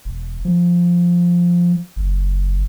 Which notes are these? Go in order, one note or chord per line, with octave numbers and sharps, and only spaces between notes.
E1
F3
F#1